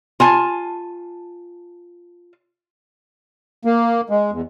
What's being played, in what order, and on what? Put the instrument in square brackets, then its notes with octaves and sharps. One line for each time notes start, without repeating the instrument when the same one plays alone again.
[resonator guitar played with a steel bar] F4 G#5 A5
[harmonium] A#3
G#3
E2